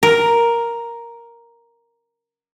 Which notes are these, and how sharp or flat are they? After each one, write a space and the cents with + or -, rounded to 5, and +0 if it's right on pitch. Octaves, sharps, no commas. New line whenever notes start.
A#4 +5